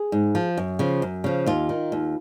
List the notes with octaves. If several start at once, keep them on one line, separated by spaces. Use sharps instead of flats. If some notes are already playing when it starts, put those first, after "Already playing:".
Already playing: G#4
G#2
F3
F#2
C#3 F3
F#2
C#3 F3
D#2 F4
D#3
D#2